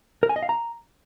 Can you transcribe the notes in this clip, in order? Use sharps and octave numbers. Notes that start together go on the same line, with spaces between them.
A#4
G#5
D#5
F5
A#5